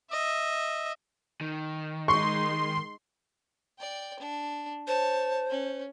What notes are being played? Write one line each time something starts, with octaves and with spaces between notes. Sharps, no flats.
D#5 E5
D#3
G#3 D#4 C6 C#6
D5 G5
D4
C5 C#5 A5
C#4